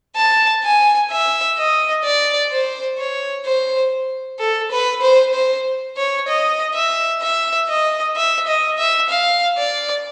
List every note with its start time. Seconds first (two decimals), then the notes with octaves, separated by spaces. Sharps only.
0.16 A5
0.64 G#5
1.11 E5
1.58 D#5
2.04 D5
2.51 C5
2.99 C#5
3.46 C5
4.39 A4
4.72 B4
5.02 C5
5.34 C5
5.97 C#5
6.28 D#5
6.74 E5
7.22 E5
7.69 D#5
8.16 E5
8.47 D#5
8.78 E5
9.09 F5
9.57 D5